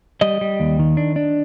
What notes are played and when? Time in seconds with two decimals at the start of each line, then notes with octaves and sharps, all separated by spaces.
0.21 G3 D#5
0.41 G3
0.60 D#2
0.79 D#3
0.97 D4
1.16 D4